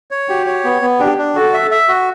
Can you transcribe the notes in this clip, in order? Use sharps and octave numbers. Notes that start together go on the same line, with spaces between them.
C#5
F#4 G4
C#5
B3
B3
D4 G4
D4
F#4 A4
E5
E5
F#4